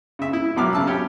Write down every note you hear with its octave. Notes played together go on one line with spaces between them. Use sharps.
C#3 E5
E4
A#1 B2 F#3 D6 F6
C#3 A5 E6
C#4 G4 C#5